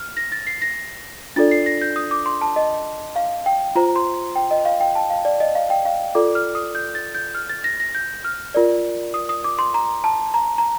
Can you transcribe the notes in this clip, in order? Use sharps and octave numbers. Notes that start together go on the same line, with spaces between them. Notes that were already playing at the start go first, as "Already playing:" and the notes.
Already playing: F6
A#6
A6
C7
A#6
D4 F4 A4 D5 A6
C7
A#6
G6
D#6
D6
C6
A5
D#5
F5
G5
F4 C5 A#5
C6
G5
D#5
F5
G5
A5
F5
D5
D#5
F5
G5
F5
F4 A4 D5 D6
F6
D#6
G6
A6
G6
F6
A6
A#6
A#6
G6
F6
F4 A#4 D5
D#6
D#6
D6
C6
A#5
A5
A#5
A#5